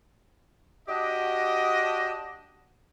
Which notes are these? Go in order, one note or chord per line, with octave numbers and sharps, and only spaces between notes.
D4 F#4 G4 D5 D#5